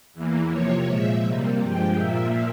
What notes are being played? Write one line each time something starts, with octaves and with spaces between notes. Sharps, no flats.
E2 E3 A#3
C3 F3 A#3 C#5
A#2 F3 G#3 E5
C3 G3 A#3
G2 F3 G#3 G5
A#2 F3 A#3 E5